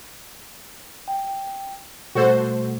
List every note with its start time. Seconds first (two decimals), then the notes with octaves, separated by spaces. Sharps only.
1.08 G5
2.15 B2 G3 A3 F#4 A4 C5